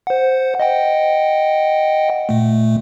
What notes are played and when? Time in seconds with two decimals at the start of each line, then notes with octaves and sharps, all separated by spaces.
0.07 C5 F#5
0.60 D#5 F#5 G5
2.29 A#2 A3